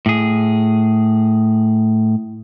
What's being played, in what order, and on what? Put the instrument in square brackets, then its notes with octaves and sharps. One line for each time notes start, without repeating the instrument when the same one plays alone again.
[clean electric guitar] A2 G#4